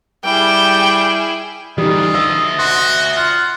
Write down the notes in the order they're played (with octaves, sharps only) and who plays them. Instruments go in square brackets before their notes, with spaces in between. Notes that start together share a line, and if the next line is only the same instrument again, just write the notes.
[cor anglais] G3 [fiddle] E4 G#4 [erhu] G5
[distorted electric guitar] D3 E3 [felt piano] G3 D#4 [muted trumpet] F4 [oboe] D#5
[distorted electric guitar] D5 E5 [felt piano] E6
[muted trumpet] F#4 [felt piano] C6
[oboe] F4 [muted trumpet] F#5